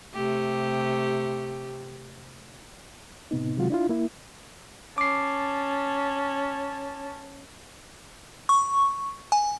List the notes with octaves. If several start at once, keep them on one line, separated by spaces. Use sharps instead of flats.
C3 A3 G4
A2 C3 B3 D#4
C3 D#3 F#3 G#3 F4 F#4
D4 E4 F4
A#3 E4
C#4 A5 D6 C7
C#6
G#5